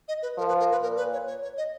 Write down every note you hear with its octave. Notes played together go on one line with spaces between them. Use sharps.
D#5
B4
F3 A#4
B4
A#4
B4
A#2 A#4
B4
C#5
C#5
C#5
D#5